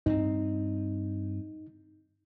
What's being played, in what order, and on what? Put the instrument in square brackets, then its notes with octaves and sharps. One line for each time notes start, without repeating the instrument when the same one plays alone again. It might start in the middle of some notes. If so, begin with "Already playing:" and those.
[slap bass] G2 C4 [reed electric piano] D#4